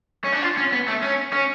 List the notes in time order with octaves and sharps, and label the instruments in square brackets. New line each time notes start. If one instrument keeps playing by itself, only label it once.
[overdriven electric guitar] C#4
D4
F4
C#4
B3
A3
C#4
C#4